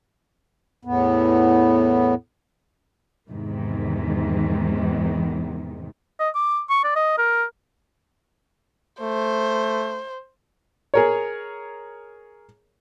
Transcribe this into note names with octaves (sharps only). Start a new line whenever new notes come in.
E2 A2 B3
E2 G#2 C3 D#3 E3
D#5
D6
C#6
D5
D#5
A#4
A3 C5
G#4 A#4 C#5